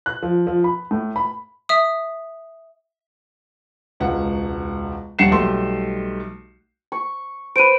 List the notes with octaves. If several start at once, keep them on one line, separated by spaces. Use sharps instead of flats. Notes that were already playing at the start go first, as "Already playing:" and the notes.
F#6
F3
F3
B5
A2
B5
E5 D#6
E1 C#2 F#5
D#1 G3 F#5 C7 C#7 E7
B1 G3 A3 C6
C#6
B4 C5 D7 D#7